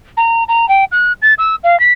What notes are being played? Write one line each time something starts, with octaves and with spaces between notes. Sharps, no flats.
A#5
A#5
G5
F#6
A6
E6
F5
B6